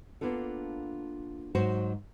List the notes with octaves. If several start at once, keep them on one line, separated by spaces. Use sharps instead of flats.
A#3 B3 D4 F4 A4
G#2 F#3 F#4 C5